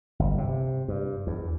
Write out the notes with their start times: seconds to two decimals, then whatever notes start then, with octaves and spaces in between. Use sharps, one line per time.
0.19 G1
0.38 C3
0.88 G2
1.27 E2